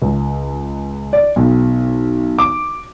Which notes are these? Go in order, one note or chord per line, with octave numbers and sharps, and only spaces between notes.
C#2
D5
B1
D6